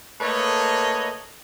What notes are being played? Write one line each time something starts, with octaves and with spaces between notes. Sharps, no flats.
A3 A#3 A4 B4 C#5 D#5